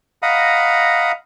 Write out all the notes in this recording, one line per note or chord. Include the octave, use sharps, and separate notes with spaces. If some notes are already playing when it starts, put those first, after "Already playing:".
D#5 F5 F#5 A#5 B5 D#6